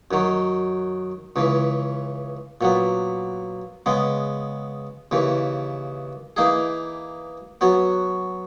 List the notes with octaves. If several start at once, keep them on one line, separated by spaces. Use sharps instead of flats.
F#2 D#3 F#3
C#2 C#3 E3
A#2 F#3 B3
C#3 G#3 B3
D#2 C#3 E3
E3 A#3 D#4 G#4
F#3 B3 F#4 C#5